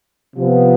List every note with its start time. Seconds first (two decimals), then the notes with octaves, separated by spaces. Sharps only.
0.36 C3 F3 B3